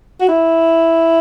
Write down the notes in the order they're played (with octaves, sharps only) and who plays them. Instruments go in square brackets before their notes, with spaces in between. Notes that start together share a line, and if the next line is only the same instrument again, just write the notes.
[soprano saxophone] F#4
E4